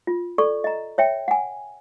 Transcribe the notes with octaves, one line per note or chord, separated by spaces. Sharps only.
F4
A4 D5 C#6
D#5 A#5
C#5 E5 G5
F#5 G#5